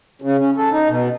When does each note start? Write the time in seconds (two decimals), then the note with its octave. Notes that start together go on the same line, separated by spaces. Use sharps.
0.22 C#3
0.39 C#4
0.58 A4
0.72 D#4
0.88 B2